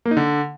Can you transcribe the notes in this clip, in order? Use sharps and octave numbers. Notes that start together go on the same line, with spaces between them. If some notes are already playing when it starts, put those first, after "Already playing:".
A#3
D#4
D3